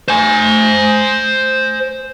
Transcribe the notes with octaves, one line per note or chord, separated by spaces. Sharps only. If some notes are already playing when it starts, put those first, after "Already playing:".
C5 G#5